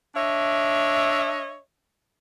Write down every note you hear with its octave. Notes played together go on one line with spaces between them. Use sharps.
D4 C#5 D#5 E5